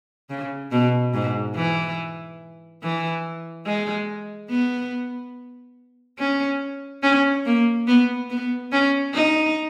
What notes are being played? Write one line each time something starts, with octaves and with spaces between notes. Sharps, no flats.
C#3
B2
G#2
E3
E3
G#3
B3
C#4
C#4
A#3
B3
B3
C#4
D#4